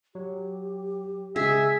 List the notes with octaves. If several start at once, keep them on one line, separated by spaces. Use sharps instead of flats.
F#3 G4
C#3 G#3 G#4 E5